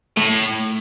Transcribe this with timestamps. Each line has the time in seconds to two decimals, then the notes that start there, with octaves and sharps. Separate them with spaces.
0.17 A2 A3